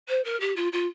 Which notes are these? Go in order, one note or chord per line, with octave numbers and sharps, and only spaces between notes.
C5
A#4
G4
F4
F4